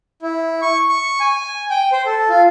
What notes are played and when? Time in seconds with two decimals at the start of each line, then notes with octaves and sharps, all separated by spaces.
0.22 E4
0.62 C#6
0.89 C#6
1.20 G#5
1.71 G5
1.92 C5
2.06 A4
2.29 F4